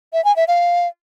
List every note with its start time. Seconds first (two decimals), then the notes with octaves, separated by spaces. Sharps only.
0.13 E5
0.25 G#5
0.36 E5
0.48 F5